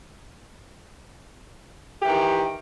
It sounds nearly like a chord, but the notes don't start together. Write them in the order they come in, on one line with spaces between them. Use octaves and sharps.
G4 E3 D#3